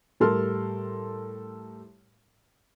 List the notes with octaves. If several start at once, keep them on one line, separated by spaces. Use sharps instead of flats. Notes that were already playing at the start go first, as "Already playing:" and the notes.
A2 G3 A4 A#4 C6 F6